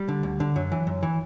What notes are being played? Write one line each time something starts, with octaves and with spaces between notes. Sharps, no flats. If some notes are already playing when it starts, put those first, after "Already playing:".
Already playing: G3
D3
D2
D3
F#2 F#3
E3
F#2
E3